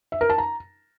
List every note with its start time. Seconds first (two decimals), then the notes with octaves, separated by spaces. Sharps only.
0.12 E5
0.21 A#4
0.30 A5
0.38 A#5